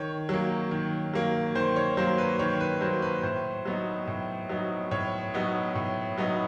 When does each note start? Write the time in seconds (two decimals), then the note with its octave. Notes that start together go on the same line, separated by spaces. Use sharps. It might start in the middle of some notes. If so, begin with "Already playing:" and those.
Already playing: D#3 C#5
0.29 F#3 A#3
0.71 D#3
1.14 F#3 A#3
1.55 D#3 C5
1.76 C#5
1.97 F#3 A#3 C5
2.18 B4
2.39 D#3 C#5
2.60 B4
2.81 F#3 A#3 C5
3.02 B4
3.23 A2 C5
3.65 F#3 B3 D#4
4.07 A2
4.49 F#3 B3 D#4
4.91 A2 C#5
5.34 F#3 B3 D#4
5.75 A2
6.18 F#3 B3 D#4